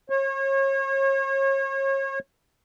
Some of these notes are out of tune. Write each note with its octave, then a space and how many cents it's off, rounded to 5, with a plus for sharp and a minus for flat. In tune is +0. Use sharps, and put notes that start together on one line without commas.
C#5 -35